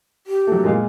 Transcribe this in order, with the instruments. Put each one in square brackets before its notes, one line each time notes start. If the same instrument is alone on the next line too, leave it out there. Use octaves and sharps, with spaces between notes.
[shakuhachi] G4
[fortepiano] F#3 A3
A#2 G#3 F5